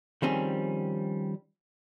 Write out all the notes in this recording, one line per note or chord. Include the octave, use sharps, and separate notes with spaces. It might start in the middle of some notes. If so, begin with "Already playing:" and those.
D#3 F3 G3 C4 C#4 G#4